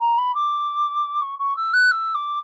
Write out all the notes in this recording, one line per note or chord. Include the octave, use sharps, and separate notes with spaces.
A#5
B5
D6
C#6
C#6
E6
F#6
E6
D6